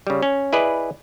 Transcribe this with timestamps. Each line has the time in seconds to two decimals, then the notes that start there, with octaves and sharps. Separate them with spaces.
0.07 C#3 G3
0.23 C#4
0.53 E4 G#4 B4 D5 D#5